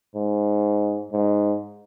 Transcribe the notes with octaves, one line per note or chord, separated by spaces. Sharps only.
G#2
G#2